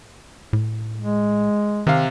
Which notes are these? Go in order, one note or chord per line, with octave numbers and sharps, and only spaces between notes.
A2
G#3
C3 D#3 F5